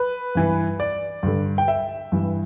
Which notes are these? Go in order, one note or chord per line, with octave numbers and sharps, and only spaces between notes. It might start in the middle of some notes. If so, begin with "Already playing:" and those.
Already playing: B4
G2 E3
D5
G2 D3
G5
E5
G2 E3